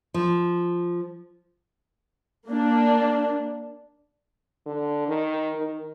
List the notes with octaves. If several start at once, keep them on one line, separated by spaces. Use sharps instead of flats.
F3
A#3 D4
D3
D#3
D#3